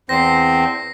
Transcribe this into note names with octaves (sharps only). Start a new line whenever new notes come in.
E2 C4 C5 A#6 C7